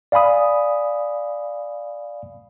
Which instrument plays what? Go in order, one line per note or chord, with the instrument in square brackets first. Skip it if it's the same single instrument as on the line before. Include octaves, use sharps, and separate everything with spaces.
[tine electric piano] D5 F5 G#5 B5 D#6